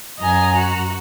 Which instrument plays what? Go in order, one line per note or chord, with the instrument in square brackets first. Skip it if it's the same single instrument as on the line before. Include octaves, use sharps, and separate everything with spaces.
[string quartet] F#2 A#5 [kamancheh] D#5 G#5
[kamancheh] F#4